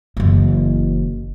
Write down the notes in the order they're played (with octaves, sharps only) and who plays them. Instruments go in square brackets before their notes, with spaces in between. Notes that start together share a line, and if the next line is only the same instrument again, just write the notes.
[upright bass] F#1 E3